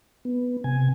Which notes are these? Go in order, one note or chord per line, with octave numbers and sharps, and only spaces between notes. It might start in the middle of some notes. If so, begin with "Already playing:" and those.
B3
C3 G#5